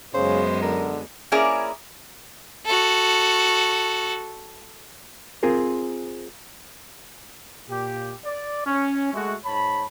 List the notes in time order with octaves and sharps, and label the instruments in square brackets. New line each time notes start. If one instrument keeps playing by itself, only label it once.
[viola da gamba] F#2 G#3 B3 [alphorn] C#3 [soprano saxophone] C5
[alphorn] D3 [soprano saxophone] A#4
[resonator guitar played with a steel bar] A#3 C#4 E4 G#4 A#4 D5
[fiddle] F#4 A4
[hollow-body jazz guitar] C4 F4 G#4 A#4 C5
[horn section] A#2 G4
D5
C#4
G#3 A3 F#4
G#2 C#5 A5 B5